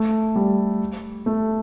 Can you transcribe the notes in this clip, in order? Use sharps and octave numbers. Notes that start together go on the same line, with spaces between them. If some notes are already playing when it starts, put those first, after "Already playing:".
Already playing: A3
G3
A3